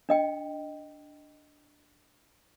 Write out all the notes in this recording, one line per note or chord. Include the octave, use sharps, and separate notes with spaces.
D4 D#5 G5